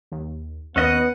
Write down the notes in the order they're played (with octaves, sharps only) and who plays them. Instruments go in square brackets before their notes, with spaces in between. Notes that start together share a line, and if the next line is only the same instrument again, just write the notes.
[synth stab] D#2
[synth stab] D#2 [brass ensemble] B3 [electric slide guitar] C#4 D#5 [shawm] F#5